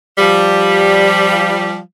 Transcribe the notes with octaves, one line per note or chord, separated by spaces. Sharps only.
F3 G3